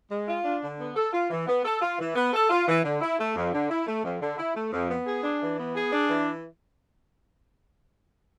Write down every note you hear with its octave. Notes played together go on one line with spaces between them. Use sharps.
G#3
F4
D4
D3
B3
A4
F4
E3
B3
A4
F4
E3
B3
A4
F4
E3
D3
E4
A3
F2
D3
E4
A3
F2
D3
E4
A3
F2
B3
G#4
D4
E3
B3
G#4
D4
E3